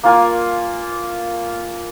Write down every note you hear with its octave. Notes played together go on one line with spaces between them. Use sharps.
A#3 F4 G#5